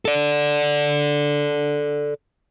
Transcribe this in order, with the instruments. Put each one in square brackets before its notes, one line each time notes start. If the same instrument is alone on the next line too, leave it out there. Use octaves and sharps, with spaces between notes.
[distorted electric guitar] A4 D5